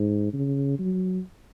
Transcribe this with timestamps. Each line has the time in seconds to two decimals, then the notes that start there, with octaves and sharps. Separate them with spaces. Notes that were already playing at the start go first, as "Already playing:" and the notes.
Already playing: G#2
0.33 C#3
0.79 F#3